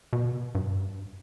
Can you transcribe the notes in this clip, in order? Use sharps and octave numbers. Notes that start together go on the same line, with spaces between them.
B2
G2